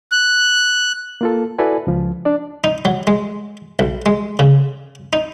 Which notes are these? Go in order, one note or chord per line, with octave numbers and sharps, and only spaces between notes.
F#6
A#3 F4 A4
E4 F#4 A4 B4 D5 G#5
C#2 F3
D4 D5
D#4
F#3
G#3
B1
G#3
C#3
D#4